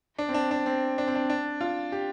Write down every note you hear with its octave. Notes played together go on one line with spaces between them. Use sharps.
D4
C4
D4
D4
C4
D4
C4
D4
D4
F4
G4